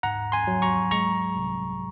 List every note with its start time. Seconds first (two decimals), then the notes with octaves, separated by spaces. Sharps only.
0.03 G#2 F#5 A#5
0.32 G#5 C6
0.47 F#3
0.62 A#5 C#6
0.91 G#3 A#5 C#6
1.36 C2